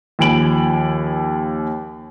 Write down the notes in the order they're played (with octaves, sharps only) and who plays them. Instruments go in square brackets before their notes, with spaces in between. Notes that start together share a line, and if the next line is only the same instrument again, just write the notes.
[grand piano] D#2 F3 G#5 B5 D7 F#7